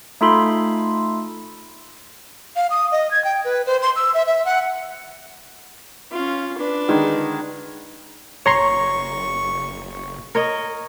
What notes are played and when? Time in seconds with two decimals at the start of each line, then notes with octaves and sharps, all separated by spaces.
0.21 A3 D#4 F4 A4 B5 C6
2.56 F5
2.70 D#6
2.92 D#5
3.11 G#6
3.25 G5
3.44 B4
3.66 C5
3.82 C6
3.96 E6
4.14 E5
4.27 E5
4.45 F#5
6.12 C#4 F4
6.58 D4 B4
6.88 D3 D#3 G#3
8.46 F#1 C#5 A#5 C6 C#6
10.35 A#4 C#5 D#5